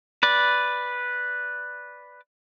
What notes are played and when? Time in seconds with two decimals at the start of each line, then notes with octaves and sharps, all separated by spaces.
0.23 B4 D5